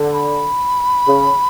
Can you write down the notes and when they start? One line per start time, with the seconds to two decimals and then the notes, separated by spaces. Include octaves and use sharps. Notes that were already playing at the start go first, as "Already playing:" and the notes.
Already playing: D3
0.13 B5
1.07 C#3